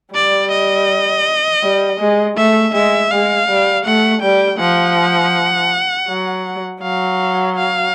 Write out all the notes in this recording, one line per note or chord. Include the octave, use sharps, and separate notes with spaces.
G3 D5
D#5
G3
G#3
A3 E5
G#3 E5
G#3 F5
G3
A3 F#5
G3 G5
F3 F#5
F#3
F#3 F5
F5